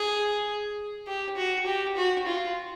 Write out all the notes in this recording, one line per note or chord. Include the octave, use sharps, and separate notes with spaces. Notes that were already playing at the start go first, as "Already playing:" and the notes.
Already playing: G#4
G4
F#4
G4
F#4
F4